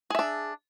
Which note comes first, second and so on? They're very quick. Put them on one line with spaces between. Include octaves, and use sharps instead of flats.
G#4 E5 D4